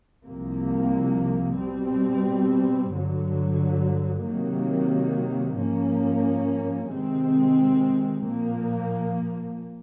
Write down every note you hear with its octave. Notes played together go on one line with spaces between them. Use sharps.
C2 C3 F3 A#3
B2 G3 C4
G2 D3 F#3
C3 D#3 F#3 A#3
G#2 F3 A#3 C#4
C3 D#3 G#3 C4
A#2 F3 A#3